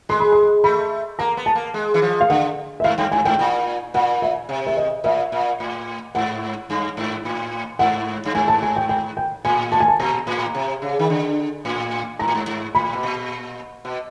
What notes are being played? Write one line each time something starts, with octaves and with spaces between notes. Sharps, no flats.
G#3 C6
B5
C6
A3 B5
A#3 A#5
B3
A5
A#3
G#3
E3
F3
F5
D3 F#5
E5
G#2 F5
G2 G5
G#2 G#5
G#2 G5
A#2
A#2 F#5
E5
C3
E5
D#5
A#2 E5
A#2
A2
G#2 F#5
G2
G#2
A2
G#2 F#5
G2
G#2 G#5
A5
G#5
G5
G5
G5
A2 G#5
A5
G#5
A5
A#2 A#5
A2
C3
C#3
D#3
D3
A2
G#2 A#5
A2
G#2
G#2
A2 B5
B2
A#2
B2